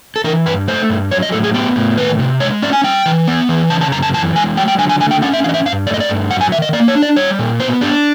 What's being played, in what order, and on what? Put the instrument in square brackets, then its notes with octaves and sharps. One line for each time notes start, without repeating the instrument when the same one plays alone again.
[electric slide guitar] A4
E3 A#4
G2 B4
A3 C5
G2
F#3 C#5
D#5
A2 A4
G#4
B3 G4
A2
D#3 B4
C3
G#3 C#5
C#4 D5
G#5
G3 G5
E3
B3
E3
C#3 A5
A5
F#2 A#5
A5
E3 A5
G#3 G#5
F#3 G5
G5
D3 G#5
G#5
A3 G#5
G5
C#4 F#5
E5
E3 F5
D#5
E5
G2 F5
A3 D5
D#5
D5
G2
F#3 F#5
G#5
D#3 E5
D#5
A#3 D5
C#5
D4
D5
G3 C#5
A#2
B3 C5
D4 G4